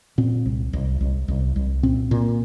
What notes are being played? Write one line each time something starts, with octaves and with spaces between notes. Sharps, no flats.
A#2 C4
C2
C2
C2
C2
C2
A#2 C4
A#2